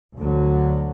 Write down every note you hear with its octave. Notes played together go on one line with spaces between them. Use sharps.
D2 D3 F#3